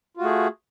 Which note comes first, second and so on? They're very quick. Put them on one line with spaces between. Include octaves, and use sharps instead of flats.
F4 F#4 A3 G#4